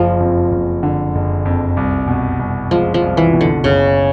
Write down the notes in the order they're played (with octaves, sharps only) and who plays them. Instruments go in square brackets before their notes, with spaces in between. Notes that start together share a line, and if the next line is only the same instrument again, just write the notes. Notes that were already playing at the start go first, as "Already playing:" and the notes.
Already playing: [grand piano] F#1 [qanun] F3
[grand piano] F2
F#1
D3
F#1
F2
C2
B2
C2
[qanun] F3 [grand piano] G#3
[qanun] F3
[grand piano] C2
[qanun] E3
[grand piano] B2
[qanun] D3
[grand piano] F#1 [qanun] C#3